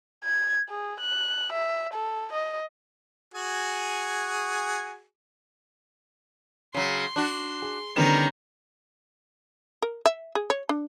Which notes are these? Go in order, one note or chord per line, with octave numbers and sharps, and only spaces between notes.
G#6
G#4
F#6
E5
A4
D#5
F#4 G#4 G#5
C#3 F#3 C6
D4 F#4
G#4
D3 D#3 G3 B3 C#4 A#5 E7
A#4
E5
G#4
C#5
D4